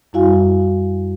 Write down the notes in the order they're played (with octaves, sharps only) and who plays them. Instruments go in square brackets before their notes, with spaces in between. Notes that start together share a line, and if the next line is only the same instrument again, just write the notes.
[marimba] F#2 G3 E4 F#4 F5 G#5